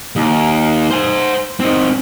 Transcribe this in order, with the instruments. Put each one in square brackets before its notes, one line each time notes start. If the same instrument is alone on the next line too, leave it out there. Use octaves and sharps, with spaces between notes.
[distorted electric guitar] D#2
C5 G#5
C4 D#4